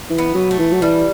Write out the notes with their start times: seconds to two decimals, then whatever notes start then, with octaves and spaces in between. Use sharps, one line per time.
0.10 E3
0.18 B3
0.34 F#3
0.51 A3
0.59 E3
0.72 F#3
0.81 E3 G3